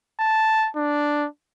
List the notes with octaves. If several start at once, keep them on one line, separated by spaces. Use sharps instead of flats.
A5
D4